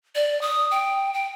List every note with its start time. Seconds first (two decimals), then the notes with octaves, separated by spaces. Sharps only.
0.15 D5
0.41 D#6
0.71 G5
1.14 G5